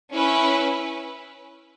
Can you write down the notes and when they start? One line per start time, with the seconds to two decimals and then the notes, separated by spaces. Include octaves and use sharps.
0.13 C#4 E4 B4